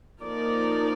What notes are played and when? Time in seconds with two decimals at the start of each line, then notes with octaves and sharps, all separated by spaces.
0.21 F3 A#3 D#4 A#4 D5